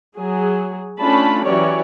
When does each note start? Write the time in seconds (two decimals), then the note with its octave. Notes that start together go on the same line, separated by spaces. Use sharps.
0.16 F#3 G#4
1.01 A3 C#4 D4 F4 A5 B5
1.45 E3 F#3 C#4 G4 C#5 D5